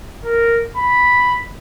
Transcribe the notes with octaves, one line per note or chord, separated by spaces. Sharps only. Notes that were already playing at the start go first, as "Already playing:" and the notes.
A#4
B5